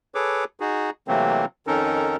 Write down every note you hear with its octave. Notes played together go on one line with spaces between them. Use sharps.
G#4 A4 B4 C#5 D6
D#4 F#4 G#4
C3 E3 F#3 A3 A#3 C4
F2 D#3 C#4 D#4 A4 A#4